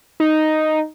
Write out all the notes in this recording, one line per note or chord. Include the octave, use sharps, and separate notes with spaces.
D#4